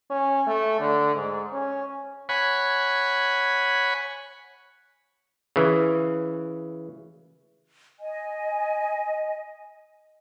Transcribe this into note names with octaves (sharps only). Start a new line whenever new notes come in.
C#4
A3
D3
G#2
C#4
C#5 F#5 G#5 B5
C#3 E3
D#5 G#5